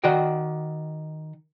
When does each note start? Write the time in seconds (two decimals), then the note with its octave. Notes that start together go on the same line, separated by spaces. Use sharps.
0.04 D#3 F#4 D5 D#5 G5